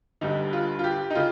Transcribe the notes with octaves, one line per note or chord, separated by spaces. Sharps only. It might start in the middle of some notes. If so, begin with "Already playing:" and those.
G1 G2 G3 D#4
F4
F4
G4
D#4
C#3 F4